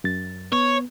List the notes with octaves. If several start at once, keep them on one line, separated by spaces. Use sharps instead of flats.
F#2 A6
B3 C#5